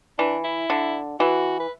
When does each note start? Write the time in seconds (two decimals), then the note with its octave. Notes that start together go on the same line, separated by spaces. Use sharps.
0.18 E3 D4
0.44 E4
0.70 D3
1.20 E3 F#4
1.60 B4